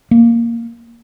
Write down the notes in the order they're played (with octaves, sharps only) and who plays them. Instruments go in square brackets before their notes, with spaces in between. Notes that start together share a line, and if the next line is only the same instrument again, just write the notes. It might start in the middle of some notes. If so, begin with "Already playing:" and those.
[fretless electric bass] A#3